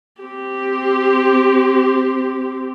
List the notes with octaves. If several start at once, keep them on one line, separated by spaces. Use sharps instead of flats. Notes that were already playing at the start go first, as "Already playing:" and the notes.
C4 G4